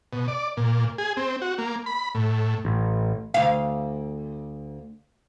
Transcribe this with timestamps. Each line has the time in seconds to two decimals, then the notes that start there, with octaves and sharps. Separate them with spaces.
0.13 B2
0.28 D5
0.57 A#2
0.98 G#4
1.17 C4
1.42 F#4
1.58 A#3
1.86 B5
2.15 A2
2.65 A1
3.34 D2 F5